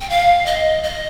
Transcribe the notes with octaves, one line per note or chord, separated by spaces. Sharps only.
G5
F5
D#5
D#5